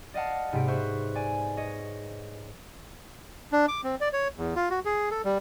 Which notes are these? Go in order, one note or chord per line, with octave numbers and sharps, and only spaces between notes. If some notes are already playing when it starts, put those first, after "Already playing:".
D5 D#5 F5 F#5 A5
G#2 C3 B3 C4 B6 D7
B4 C5 E5 C#6 F#6
D5 G#5
C#5 D#5
D4
D6
C4
D5
C#5
E2
F4
F#4
G#4
A4
G3